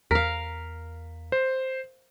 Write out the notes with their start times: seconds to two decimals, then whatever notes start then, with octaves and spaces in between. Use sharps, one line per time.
0.11 E2 A#4 F5 B6
1.32 C5